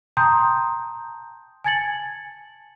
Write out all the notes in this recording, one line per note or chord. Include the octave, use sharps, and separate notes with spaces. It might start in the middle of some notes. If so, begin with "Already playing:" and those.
G5 A5 A#5 C6 D#6 G6
G#5 A5 G#6 A6 C#7 F#7